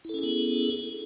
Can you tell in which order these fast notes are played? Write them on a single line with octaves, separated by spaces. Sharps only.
E4 A4 C#4 G#4 B3